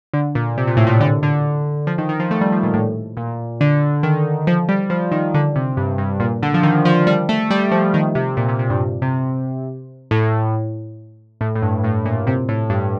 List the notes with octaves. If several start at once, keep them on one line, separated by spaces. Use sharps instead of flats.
D3
A#2
C3
A#2
A2
A#2
D3
D3
F3
D#3
D#3
F3
A3
G3
F3
A#2
A2
A#2
D3
D#3
F3
G3
F3
D#3
D3
C3
G2
G2
A#2
D3
F3
D#3
F3
G3
A3
G3
F3
D#3
C3
A#2
C3
C3
G2
C3
A2
A2
A2
G2
A2
A#2
C3
A2
G2